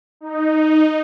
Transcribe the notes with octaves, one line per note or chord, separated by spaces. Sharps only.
D#4